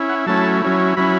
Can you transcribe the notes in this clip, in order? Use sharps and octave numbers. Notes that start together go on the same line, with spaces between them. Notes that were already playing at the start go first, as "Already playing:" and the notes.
Already playing: C#4 E4
F#5
F#3 A3 C#4 E4 A5
F#3 C#4 E4
F#3 C#4 E4 B5